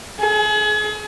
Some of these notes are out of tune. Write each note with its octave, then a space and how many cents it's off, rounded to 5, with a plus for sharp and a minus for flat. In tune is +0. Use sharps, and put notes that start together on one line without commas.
G#4 +35